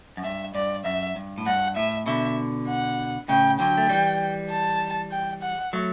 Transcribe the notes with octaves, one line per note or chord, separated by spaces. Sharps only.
F#2
G2 E5
G2 D5
F#2 E5
G2
A2
G2 F#5
A2 E5
B2 D3 E5
F#5
A2 C#3 G5
D3 F#3 G5
A3
E3 G3
A5
G5
F#5
F#3 A3